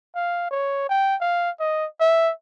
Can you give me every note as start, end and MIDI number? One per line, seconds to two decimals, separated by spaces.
0.16 0.48 77
0.51 0.86 73
0.89 1.16 79
1.21 1.50 77
1.60 1.86 75
2.00 2.31 76